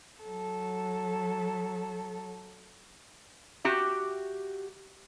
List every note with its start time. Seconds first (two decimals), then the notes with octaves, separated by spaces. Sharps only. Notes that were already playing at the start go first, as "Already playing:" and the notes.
0.22 F#3 A4
3.64 F#4 G4 E5